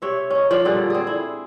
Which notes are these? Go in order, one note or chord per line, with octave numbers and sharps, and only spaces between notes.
C3 C#5 E5
C#4 D#4
F3 D5 F5
A#2 D3 G3 G#4
C4 G#4
E4